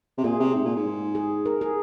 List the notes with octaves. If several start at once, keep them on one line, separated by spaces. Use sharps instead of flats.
C3
A#2 G#4
C3
G#2
A#2
G#2
G#4
A#4
G#4